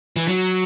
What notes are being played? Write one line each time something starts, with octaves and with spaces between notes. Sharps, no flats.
E3
F#3